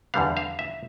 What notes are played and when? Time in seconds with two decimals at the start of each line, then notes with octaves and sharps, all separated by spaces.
0.14 E2 D3 G3 B3 F5
0.37 F5
0.59 E5